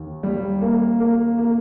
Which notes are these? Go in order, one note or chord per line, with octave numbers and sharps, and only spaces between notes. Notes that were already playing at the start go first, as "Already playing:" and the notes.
Already playing: D#2 D#3
G3
A#3
A#3
A#3